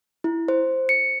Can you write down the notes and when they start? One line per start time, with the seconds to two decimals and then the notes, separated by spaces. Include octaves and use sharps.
0.24 E4
0.48 C5
0.89 C#7